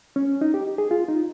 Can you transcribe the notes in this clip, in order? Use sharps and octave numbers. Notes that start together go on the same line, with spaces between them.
C#4
D#4
G4
G#4
F4
D#4